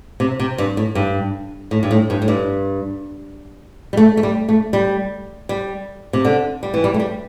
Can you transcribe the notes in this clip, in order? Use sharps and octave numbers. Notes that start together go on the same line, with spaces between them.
C3
C3
G2
A2
G2
A2
G2
A2
G2
A2
G2
G3
A3
A3
G3
A3
G3
G3
C3
D3
G3
E3
G3
A3
G3